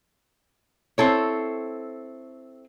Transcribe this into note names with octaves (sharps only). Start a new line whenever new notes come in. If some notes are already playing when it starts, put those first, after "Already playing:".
C4 E4 A4 C#5